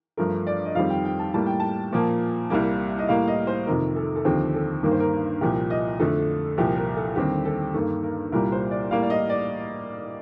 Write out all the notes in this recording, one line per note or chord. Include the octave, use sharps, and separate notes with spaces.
G2 F3 A3 A#4
D5
D#5
F2 D#3 G3 C4 F5
G5
G5
A5
A2 G3 A#3 A5
G5
A5
A#2 F3 A#3
C2 C3 G3 A#3
D#5
A2 G3 A#3 F5
D#5
C5
F2 C3 D#3 A#4
A4
A4
D#2 D3 F3 C4 G4
A4
G2 D#3 A#3 A#4
C5
A#4
C2 A#2 F3 G4
D#5
F2 D3 A3 A4
C2 A#2 F3 G4
A#4
A4
D#2 D3 G3 C4 G4
A4
G2 D#3 A#3 A4
A#4
C2 A#2 G3 A#3 A#4
C5
D5
A2 G3 A#3 F5
D5
D#5
D5